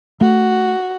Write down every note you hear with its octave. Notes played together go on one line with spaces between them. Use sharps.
A3 F#4